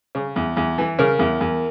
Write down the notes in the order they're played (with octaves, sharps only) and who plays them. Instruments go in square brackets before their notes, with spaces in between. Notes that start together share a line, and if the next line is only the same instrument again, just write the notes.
[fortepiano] C#3
E2
E2
E3
[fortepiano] C#3 [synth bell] A#4
[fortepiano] E2
E2